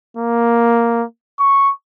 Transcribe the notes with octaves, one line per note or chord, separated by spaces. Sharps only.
A#3
C#6